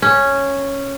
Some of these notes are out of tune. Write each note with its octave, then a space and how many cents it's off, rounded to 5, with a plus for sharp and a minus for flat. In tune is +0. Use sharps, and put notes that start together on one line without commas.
C#4 -5